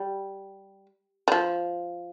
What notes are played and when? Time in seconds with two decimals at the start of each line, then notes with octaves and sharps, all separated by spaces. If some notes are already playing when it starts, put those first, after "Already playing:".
Already playing: G3
1.28 G3
1.32 F3